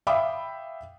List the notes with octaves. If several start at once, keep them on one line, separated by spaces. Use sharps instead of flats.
E5 F5 G5 B5 D6 D#6